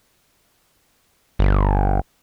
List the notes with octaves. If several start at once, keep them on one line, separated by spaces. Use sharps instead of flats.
G1